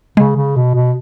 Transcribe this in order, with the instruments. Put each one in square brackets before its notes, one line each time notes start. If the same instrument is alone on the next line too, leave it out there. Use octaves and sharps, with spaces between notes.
[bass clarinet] C#3 [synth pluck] G#3
[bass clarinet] C#3
B2
B2